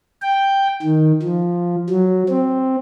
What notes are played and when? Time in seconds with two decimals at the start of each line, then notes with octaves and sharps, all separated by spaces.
0.22 G5
0.83 D#3
1.23 F3
1.89 F#3
2.29 C4